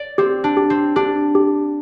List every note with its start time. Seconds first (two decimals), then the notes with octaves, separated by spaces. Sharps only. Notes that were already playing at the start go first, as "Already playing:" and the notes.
Already playing: D5
0.18 C4 G4
0.44 D4
0.57 G4
0.70 C4
0.96 D4 G4
1.35 G4